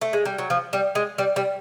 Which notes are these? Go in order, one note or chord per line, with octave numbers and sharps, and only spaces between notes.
A3
G#3
G3
F#3
F3
G3
G#3
G3
G3